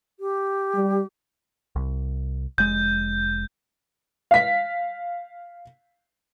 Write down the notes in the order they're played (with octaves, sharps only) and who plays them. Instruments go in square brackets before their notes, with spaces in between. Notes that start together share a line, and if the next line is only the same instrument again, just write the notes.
[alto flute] G4
[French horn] G3
[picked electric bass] C2
[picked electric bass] F1 G#3 [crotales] G6
[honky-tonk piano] F5 B6